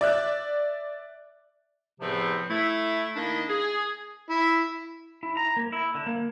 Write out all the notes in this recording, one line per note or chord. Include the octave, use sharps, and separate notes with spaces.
D5 E5 F#6
E2 A2 C3 F3 A3 C4
A3 E4
D#3 A#3 D4 E4 D#5
G#4
E4
E4
A#5
A#3
E4
D3
A#3